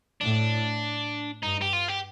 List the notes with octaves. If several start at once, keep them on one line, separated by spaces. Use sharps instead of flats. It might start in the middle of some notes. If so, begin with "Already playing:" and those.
A2 D4
G2 D#4
G4
F4
G4